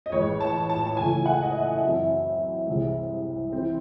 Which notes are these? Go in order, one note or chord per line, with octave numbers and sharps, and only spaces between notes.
D#5
A1 A2 G#3 C#5
A5
A5
A5
C#2 C#3 E3 A3 G#5
F#5
D#5
E5
F#2 E3 C4 E5
C2 C3 E3 G#3
E3 C4